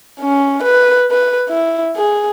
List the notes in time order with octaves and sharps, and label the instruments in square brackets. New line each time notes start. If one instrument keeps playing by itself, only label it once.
[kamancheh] C#4
B4
B4
E4
G#4